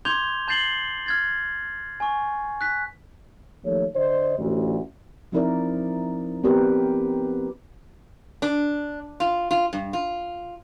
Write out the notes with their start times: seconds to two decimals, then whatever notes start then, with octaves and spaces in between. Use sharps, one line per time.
0.05 C6 D6 G6 G#6 F7 G7
0.48 A5 G6 A6 C7 F#7 G7
1.06 F6 G#6 A6
2.00 G#5 C#6
2.61 F#6 B6
3.64 D#2 F3 A3 C#5
3.95 D3 C5 D5 D#5
4.38 A1 D2
5.32 F3 C4 D#4 E4 A#4 D5
6.44 B3 C4 D4 G4 A#4 B4
8.42 D4
9.20 F4
9.51 F4
9.73 G2
9.93 F4